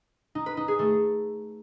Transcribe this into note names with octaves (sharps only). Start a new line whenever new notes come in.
D#4
B4
D#4
G#4
A3